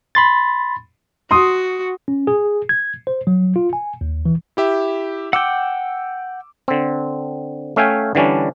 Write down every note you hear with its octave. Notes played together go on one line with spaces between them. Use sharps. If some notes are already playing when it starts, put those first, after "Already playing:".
B5 C6 A6
F#4 C6 D#6
C#4
G#4
G#6
C5
F#3
F4
G#5
D#2
E3
E4 G4 E5
F#5 G5 D6 E6
D3 C4
A3 C#4 E5 F5 G5 G#5
D3 E3 G3 C#4 D4